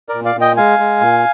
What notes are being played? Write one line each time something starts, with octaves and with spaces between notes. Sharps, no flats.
A#4 D5
A#2
D5 F5
A#2
D#5 G5
G#3 F5 G#5
G#3
A#2